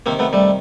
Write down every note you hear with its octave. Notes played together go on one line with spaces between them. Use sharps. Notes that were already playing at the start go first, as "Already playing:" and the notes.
C3 D#3 A#3 C4
A3 B3
G3 A3